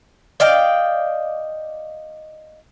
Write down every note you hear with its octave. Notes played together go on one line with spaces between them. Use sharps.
D5 D#5 F5 G5